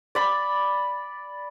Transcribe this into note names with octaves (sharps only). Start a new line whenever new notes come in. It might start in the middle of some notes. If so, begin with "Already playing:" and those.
D5 B5